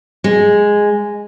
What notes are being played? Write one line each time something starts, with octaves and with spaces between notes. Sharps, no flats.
G#3